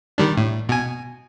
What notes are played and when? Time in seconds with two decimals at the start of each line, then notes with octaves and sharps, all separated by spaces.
0.18 D#3 G3 D4
0.37 A2
0.69 B2 G#5